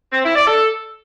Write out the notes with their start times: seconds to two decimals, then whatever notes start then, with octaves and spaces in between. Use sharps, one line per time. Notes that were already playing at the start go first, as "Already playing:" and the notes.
0.12 C4
0.24 E4
0.36 D5
0.47 A4